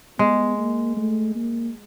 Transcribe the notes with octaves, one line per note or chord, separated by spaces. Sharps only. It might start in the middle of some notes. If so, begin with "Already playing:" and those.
G#3 B3
A#3
A3
A#3